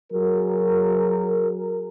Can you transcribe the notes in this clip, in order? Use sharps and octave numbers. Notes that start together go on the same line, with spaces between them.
F#3 G#4 A#4